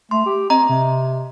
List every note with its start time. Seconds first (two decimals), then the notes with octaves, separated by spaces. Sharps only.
0.11 A3 C6
0.26 G4
0.50 C4 D#5 A#5
0.69 C3